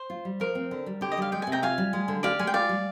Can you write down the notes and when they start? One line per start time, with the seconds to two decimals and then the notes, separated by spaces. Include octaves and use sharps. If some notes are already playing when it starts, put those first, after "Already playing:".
Already playing: C5
0.10 F4
0.25 G3
0.40 F3 A#4
0.55 C4
0.71 D3
0.86 G3
1.01 D3 G4
1.12 D#5
1.17 G3 F5
1.32 G#3 G5
1.42 G#5
1.47 C3
1.52 G5 A#5
1.62 F4 F5 G#5
1.78 G3
1.93 G#3
2.08 D3
2.23 G4 D5 F5
2.39 G#3 G#5
2.47 G5
2.54 F4 D5 F5
2.69 G3